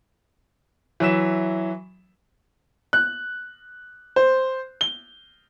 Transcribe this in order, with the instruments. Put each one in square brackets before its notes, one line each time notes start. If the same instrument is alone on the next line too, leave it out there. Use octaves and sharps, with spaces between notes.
[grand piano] E3 F#3 E5 E7
[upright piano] F#6
C5
G7